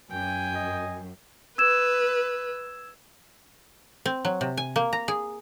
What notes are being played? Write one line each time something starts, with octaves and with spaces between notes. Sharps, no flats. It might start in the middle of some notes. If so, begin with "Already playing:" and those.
F#2 G5 G#5
D#5
B4 E6 G#6 E7
C4
F#3
C3
G#5
A#3
A#5
G#4